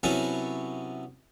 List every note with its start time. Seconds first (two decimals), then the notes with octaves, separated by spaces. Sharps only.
0.03 C3 F#3 B3 C#4 E4 A4